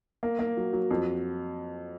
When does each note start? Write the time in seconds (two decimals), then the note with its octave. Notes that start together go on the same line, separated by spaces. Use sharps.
0.23 A#3
0.39 A#3
0.57 F#3
0.73 F#3
0.91 F2